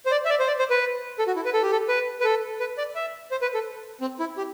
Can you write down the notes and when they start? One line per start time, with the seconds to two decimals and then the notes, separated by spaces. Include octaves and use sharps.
0.06 C5
0.11 D5
0.25 E5
0.30 D5
0.40 C5
0.47 D5
0.59 C5
0.70 B4
1.19 A4
1.27 F#4
1.36 E4
1.45 B4
1.54 A4
1.62 G4
1.72 A4
1.88 B4
2.20 B4
2.24 A4
2.60 B4
2.78 D5
2.95 E5
3.31 C5
3.42 B4
3.54 A4
4.01 C4
4.20 E4
4.37 G4